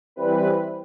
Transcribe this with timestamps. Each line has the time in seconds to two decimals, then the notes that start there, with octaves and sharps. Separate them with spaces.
0.16 E3 G3 C4 B4